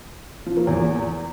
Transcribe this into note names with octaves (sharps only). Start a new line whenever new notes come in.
F3
A#3
E2